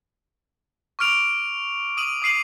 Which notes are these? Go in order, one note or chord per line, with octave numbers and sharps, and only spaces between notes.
C#6 D6 F6 D7 F7
D#6 D#7 F#7
D6 D#6 C7 D#7 F#7